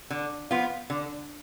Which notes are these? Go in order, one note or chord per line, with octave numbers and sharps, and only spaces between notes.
D3
F3 B3 F4
D3